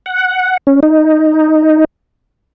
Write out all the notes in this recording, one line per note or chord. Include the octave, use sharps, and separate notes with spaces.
F#5
C#4
D#4